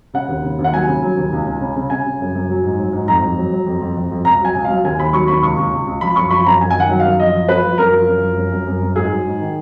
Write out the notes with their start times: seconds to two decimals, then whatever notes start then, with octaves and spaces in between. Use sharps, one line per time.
0.14 C#3 F#5
0.28 D#2
0.44 C#3
0.59 D#2
0.64 F#5
0.73 F#3 G#5
0.88 C#3
1.02 F#3
1.17 D#2
1.32 C#2
1.47 C#2
1.60 C#3
1.76 C#3
1.90 C#3 G#5
2.06 C#3
2.20 F#2
2.35 F#2
2.50 F#3
2.64 G#2
2.79 F#3
2.93 G#2
3.08 F2 A#5
3.22 F2
3.37 F#3
3.52 F#3
3.66 F2
3.81 F2
3.97 F2
4.11 F2
4.25 C#2 A#5
4.40 F#3 G#5
4.55 C#2
4.64 F#3 F5
4.84 D#2 G#5
4.99 D#2 B5
5.13 F#3 C#6
5.28 D#2 B5
5.43 C#2 C#6
5.58 C#2
5.72 C#2
5.86 C#2
6.01 F3 B5
6.16 F#2 C#6
6.31 F3 B5
6.46 F#2 A#5
6.60 F#2 G#5
6.70 G#5
6.75 D#3 F#5
6.90 F#3
6.99 F5
7.05 F#2
7.19 F3 D#5
7.35 F3
7.48 F3 B4
7.63 F3
7.78 F#2 A#4
7.92 F3
8.07 F#2
8.22 F3
8.36 F#2
8.52 F#2
8.67 F#2
8.81 F#2
8.95 G#2 G#4
9.10 F#3
9.25 G#2
9.40 D#3